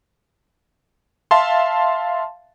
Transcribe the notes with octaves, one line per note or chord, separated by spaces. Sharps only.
E5 F5 A5 C6